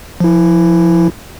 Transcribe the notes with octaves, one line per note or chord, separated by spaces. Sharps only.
F3 E4